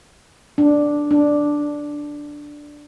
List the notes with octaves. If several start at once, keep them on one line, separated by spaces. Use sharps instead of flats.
D4
D4